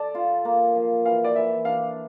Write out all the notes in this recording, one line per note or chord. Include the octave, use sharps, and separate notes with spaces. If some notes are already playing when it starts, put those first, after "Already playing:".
Already playing: A4 D5
F4
A#3
F3
E3 F5
D5
E3 E5
D4 F5